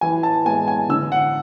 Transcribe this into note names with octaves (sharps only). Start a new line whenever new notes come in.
E3 G#5
A5
G#3 B3 G#5
G#5
D3 E6
F#5